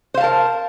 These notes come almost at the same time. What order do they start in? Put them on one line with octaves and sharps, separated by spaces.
C5 F5 A5 A#4